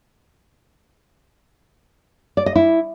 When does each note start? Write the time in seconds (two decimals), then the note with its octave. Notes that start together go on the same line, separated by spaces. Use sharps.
2.37 D5
2.46 D#5
2.55 E4